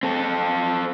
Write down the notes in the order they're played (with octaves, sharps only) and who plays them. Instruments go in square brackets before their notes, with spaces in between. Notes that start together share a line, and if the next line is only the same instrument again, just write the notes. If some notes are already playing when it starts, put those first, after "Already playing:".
[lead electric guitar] C4 A4